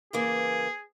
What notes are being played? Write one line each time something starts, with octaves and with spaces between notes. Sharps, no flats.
C#3 E3 A#3 G#4